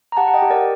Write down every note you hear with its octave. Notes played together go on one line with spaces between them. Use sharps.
A#5
G4 F#5 A5
F#5
D#5 G5
G4
A#4 D5